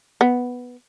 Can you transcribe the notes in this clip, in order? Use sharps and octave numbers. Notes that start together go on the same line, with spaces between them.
B3